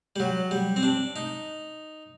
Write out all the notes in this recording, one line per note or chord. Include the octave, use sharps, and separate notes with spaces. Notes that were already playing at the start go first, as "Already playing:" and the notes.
G3
F#3
G3
C4
D4
D#4